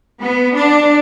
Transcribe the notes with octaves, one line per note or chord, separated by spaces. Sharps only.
B3
D4